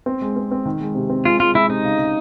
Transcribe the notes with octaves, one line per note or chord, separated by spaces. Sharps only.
C4
G#3
C4
C4
D#3
G#3
C3
C4
G#3 F4
G#3 F4
G#3 E4
C3 D#4
C#3
C#3